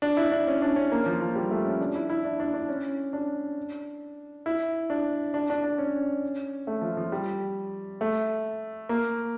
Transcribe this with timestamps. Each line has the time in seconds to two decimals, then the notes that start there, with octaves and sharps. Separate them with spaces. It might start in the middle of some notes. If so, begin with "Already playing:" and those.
0.02 D4
0.17 E4
0.32 D4
0.47 C#4
0.62 D4
0.76 C#4
0.92 A#3
1.06 F3
1.21 F3
1.35 G3
1.51 A3
1.65 C#4
1.80 D4
1.95 E4
2.10 E4
2.25 D4
2.40 D4
2.54 D4
2.69 C#4
3.13 D4
4.46 E4
4.90 D4
5.34 D4
5.50 D4
5.64 D4
5.78 C#4
6.67 A3
6.82 F3
6.97 F3
7.12 G3
8.01 A3
8.89 A#3